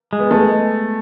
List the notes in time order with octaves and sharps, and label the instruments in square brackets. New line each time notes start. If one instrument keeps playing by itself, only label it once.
[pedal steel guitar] G#3
[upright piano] B3
A3